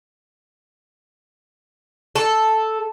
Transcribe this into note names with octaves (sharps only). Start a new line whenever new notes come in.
A4